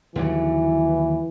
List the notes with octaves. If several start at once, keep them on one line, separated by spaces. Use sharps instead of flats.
D#2 D3 E3 F#3